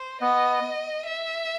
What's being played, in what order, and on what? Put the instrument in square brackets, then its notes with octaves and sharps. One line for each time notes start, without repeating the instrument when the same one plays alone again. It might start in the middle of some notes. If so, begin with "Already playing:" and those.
Already playing: [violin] C5
[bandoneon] B3 [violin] D#5
[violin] E5